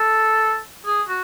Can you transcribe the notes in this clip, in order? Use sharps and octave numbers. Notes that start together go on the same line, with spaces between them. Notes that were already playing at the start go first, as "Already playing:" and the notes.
Already playing: A4
G#4
F#4